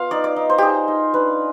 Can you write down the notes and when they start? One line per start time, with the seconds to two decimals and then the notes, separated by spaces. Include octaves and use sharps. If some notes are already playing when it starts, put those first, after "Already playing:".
Already playing: B3 F4 F5
0.11 D#4 D5
0.24 D5
0.36 D#4
0.50 C5
0.58 D#4 G4 G#4
0.88 D#4
1.14 D4 B4